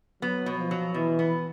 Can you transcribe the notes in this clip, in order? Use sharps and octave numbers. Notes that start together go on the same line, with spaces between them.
F#3 B3
B2
F3
F#3
B2 E3
B3